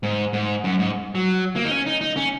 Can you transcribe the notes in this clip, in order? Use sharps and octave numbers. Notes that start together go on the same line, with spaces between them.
G#2
G#2
F#2
G#2
F#3
A#3
D#4
C#4
D#4
D#4
C#4